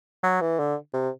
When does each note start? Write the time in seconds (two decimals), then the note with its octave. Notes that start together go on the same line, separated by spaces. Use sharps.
0.23 F#3
0.41 E3
0.59 D3
0.94 C3